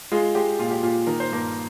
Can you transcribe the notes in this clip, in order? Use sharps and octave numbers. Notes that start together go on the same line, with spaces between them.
G#3 F4
G#3 G4
A#2 F4
G4
A#2 F4
D#3 A#4
C5
G2 A#3 A#4